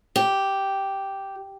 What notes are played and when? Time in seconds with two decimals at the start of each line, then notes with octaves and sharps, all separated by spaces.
0.16 G4